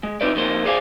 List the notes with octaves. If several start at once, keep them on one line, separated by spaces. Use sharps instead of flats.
G#3
C4 D#4 E4 B4 D5
F2 D#3 A#3 C5
G#4 C5 D5 F5 F#5 G#5